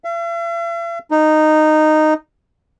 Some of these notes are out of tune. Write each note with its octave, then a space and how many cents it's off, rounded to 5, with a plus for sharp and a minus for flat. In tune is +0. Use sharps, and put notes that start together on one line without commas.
E5 +45
D#4 -10